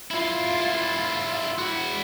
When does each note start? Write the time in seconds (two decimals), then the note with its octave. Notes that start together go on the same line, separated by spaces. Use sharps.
0.11 E4 F4
1.58 E4 F#4